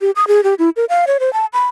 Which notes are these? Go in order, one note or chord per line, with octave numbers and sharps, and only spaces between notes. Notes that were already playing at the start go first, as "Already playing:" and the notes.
G4
D#6
G#4
G4
E4
A#4
F5
C#5
C5
A5
B5